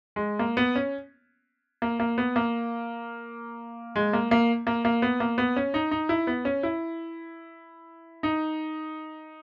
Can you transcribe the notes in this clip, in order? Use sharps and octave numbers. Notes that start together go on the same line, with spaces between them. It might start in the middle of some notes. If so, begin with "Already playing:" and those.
G#3
A#3
B3
C#4
A#3
A#3
B3
A#3
G#3
A#3
A#3
A#3
A#3
B3
A#3
B3
C#4
D#4
D#4
E4
B3
C#4
E4
D#4